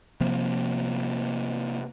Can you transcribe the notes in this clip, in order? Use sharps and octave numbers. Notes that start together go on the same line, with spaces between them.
C3 F3 A#3 C4